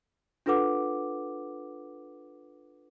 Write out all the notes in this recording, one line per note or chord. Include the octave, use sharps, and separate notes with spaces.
D4 F4 A4 B4 F#5 D6